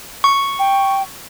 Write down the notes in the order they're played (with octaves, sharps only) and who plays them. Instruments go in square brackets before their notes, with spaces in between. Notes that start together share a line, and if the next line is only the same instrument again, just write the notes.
[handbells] C#6
[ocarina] G5